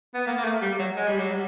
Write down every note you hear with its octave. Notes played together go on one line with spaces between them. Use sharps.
B3
A#3
A#3
A3
G3
F#3
G#3
G3
F#3
G3